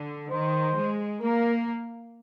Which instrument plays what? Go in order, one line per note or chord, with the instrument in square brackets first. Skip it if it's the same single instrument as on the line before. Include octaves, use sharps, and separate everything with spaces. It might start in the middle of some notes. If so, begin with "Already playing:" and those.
Already playing: [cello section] D3
[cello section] D#3 [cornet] C5
[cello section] G#3
[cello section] A#3 [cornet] A#4